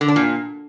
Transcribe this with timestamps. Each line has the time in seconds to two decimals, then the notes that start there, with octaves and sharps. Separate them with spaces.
0.01 D3
0.08 D4
0.16 A#2